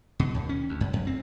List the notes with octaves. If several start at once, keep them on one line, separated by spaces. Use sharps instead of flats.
B2
D#2
C#4
D2
F#2
F2
C4